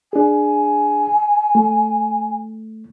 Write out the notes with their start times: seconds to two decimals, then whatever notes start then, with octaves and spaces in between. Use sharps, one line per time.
0.13 D4 G#4 G#5
1.55 A3